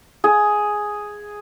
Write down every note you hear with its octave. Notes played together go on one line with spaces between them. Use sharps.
G#4